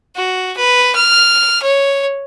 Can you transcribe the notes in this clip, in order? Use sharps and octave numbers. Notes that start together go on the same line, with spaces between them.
F#4
B4
F6
C#5